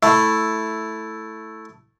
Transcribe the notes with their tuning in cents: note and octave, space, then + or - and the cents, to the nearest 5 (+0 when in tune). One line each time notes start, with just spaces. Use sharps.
A3 +0 E4 +0